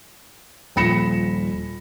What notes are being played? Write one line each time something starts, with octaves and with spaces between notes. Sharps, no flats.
D#1 F3 B5 A#6 C#7 E7